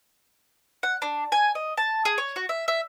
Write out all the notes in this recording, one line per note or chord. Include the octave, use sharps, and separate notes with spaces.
F#5
D4
G#5
D#5
A5
G#4
C#5
F#4
E5
E5